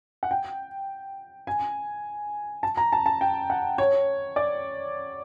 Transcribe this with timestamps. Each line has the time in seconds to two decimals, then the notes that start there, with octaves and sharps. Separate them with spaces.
0.23 F#5
0.31 G5
1.47 G#5
2.63 A5
2.77 A#5
2.93 A5
3.06 A5
3.21 G5
3.50 F#5
3.78 C#5
4.36 D5